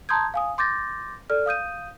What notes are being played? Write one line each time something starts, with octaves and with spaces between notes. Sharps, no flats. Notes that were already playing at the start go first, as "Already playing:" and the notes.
A5 A#5 C6 D#6 G6 G#6
F5 G#5 D#6
C6 D6 G6 A6 A#6
A4 D5 F6
F5 D#6 G6 D#7